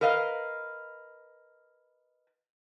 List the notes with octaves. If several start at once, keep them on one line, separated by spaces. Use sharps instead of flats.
A#4 B4 D#5 F5